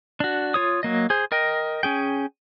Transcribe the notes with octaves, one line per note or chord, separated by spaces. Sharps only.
D4 F#4
F4 C#5 D#6
F#3 A#3 D#5
G#4 C5
A#4 D#5 G5
C#4 G#4 G5